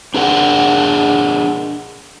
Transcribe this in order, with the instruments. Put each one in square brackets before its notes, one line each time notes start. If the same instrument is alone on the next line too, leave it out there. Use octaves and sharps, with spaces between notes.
[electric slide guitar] D4 G#4 A#4 F#5